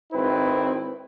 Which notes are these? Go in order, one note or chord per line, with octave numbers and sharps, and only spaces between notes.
G#1 C4 E4 B4